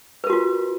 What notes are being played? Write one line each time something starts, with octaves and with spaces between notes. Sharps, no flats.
F4 F#4 A#4 B4